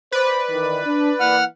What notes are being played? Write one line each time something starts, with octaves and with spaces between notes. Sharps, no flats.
B4 C5 D5
D#3 E3
D4
E3 A#3 F#5 F6